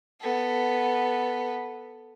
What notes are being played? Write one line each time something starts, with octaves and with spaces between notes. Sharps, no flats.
B3 A4